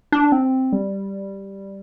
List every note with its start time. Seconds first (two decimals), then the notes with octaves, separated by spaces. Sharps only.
0.12 D4
0.32 C4
0.73 G3